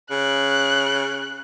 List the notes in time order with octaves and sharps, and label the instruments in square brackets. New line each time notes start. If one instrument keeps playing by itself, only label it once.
[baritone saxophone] C#3 [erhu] F#6